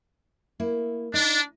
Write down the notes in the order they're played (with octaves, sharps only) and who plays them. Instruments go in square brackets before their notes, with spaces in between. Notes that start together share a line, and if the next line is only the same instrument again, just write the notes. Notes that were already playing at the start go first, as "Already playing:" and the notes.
[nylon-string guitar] A#3 E4
[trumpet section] D4 [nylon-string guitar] D#4